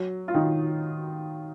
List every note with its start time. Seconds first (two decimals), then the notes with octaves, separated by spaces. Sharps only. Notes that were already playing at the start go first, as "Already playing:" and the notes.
Already playing: F#3
0.28 F4
0.34 D#3 D#4